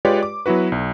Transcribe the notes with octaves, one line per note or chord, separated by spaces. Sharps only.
G#3 F4 G4 B4 C#5 D5
D6
F#3 B3 E4 F#4 B4
B1